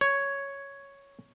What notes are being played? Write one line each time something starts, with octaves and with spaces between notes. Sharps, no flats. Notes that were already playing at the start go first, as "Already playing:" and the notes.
C#5